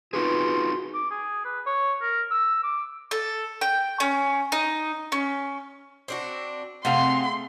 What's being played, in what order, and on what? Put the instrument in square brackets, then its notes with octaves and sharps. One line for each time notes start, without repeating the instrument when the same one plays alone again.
[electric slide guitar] D#4 F#4 G#4 [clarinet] F4 [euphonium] B4
[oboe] D6
G#4
B4
C#5
A#4
E6
D6
[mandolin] A4
G5
C#4
D#4
C#4
[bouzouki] C4 D4 F#4
[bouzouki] C3 C4 G#4 [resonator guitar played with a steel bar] A3 F5 [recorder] F#5 [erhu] C6